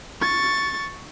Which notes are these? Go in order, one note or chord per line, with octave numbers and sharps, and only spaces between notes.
C#6 A6